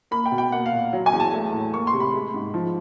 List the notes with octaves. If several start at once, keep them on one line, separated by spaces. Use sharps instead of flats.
A#3 B5
G5
B2
G5
A#3 F#5
F5
A#2
F#3
G#5
E2
A5
A3
A2
A#3 C#6
C6
C3
B5
G#3
G#2
F3